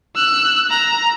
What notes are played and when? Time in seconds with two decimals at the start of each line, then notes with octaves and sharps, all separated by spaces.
0.15 E6 F#6
0.70 A#5